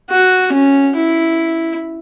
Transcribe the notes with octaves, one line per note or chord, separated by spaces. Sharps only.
F#4
C#4
E4